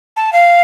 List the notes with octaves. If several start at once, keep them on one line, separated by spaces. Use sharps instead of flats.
A5
F5